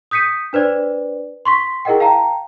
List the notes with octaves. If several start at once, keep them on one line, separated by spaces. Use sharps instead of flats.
D#6 G6 B6 C#7 D#7
D4 B4 C5 D5
C6 C#6 B6
E4 G#4 A#4 D#5 F#5 G5
F5 G5 A5 A#5